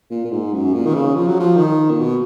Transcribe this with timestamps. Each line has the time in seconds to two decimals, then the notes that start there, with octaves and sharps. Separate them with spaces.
0.11 A#2
0.25 A#2
0.32 G#2
0.53 F#2
0.74 A#2
0.86 D#3
0.95 C#3
1.15 F3
1.28 F#3
1.40 F3
1.57 D#3
1.91 A#2
1.99 B2